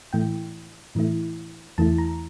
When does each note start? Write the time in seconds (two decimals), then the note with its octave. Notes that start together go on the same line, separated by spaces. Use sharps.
0.13 A2 E3 A3 E4 G5
0.95 A2 E3 A3 E4
1.78 E2 E3 A3 E4 A5
1.98 A#5